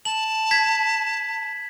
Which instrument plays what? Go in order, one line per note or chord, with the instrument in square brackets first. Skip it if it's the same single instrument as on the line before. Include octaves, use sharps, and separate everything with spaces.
[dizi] A5 [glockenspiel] F#7
[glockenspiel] G#6 B6